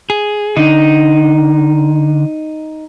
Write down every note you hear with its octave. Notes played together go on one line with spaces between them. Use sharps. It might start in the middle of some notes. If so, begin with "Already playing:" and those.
G#4
D3 D#4